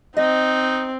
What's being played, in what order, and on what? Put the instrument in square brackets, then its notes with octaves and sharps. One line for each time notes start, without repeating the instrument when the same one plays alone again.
[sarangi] C4 [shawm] D#4 [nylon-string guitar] D#5